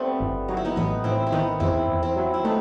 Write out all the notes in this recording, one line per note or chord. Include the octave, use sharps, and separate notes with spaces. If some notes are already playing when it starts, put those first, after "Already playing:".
Already playing: G3 A3 B3 C4 D#4
G1
F#3 D#4
E4
B3 D#4
A1 B3 D#4
A1 C4 E4
E4
D#3 B3 D#4
E2 C4 E4
E2
C4 E4
F#3
E4
A3 B3 D#4